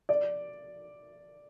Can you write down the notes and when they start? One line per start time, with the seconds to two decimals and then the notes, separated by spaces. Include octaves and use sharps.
0.09 D5